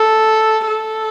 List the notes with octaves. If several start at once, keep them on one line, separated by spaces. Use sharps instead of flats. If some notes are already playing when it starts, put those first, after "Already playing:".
Already playing: A4
A4